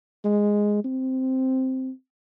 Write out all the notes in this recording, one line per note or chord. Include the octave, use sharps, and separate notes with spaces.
G#3
C4